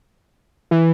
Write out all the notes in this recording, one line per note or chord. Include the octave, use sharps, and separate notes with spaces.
E3